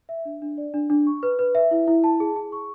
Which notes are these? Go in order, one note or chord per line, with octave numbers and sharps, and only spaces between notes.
E5
D4
D4
D5
D4
D4
C#6
B4
B4
E5
E4
E4
A5
G#4
G#4
C#6